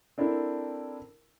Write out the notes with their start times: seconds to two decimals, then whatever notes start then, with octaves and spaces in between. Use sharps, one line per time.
0.18 C4 D4 E4 A4 A#4